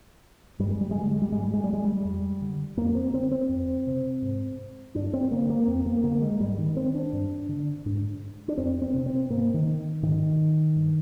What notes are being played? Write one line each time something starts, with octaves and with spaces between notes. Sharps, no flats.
G2 G3
G#3
G3
G#3
D3 G3
G#3
G3
G#2 G#3
G3
G#3
G3
G#3
G3
F2
D3
F2 A#3
C4
D3 C4
C4
F2
C3
G#2
G2 D4
C4
D3 A#3
A#3
F2 C4
A#3
D3 A#3
G#3
G#2 G3
D#3
C4
D4
G2
D3
G#2
D4
F2 C4
C4
C3
C4
G#2 A#3
D#3
G#2 D#3
G2